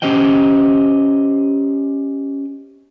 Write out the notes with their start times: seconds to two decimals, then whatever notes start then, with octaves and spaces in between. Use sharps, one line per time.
0.02 C#4 G4 C5 D#5 G5